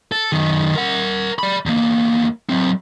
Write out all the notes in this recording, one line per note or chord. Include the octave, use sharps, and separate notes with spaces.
A4
F#2 D#3
A#4 F#5
D5 B5
E2 A#3
F#3 C4